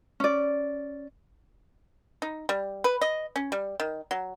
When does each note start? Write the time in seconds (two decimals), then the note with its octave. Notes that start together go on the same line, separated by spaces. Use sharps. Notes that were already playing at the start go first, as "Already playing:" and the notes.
0.20 C#4 D5
2.22 D#4
2.49 G3
2.84 B4
3.01 D#5
3.36 C#4
3.52 G3
3.80 D#3
4.11 F#3